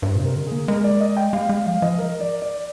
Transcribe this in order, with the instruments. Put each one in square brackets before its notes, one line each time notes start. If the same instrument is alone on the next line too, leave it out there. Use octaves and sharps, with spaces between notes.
[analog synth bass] G2 [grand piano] C5
[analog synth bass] A#2
C3
[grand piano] A#4
[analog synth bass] D3
[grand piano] G#4
[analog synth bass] A#3
[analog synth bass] G#3 [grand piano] A#4
[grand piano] D5
D#5
G5
[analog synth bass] G#3 [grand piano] F5
[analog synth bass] G#3 [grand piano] F5
[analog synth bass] F3 [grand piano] F5
[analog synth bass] F3 [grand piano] D#5
[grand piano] A#4
D5
D5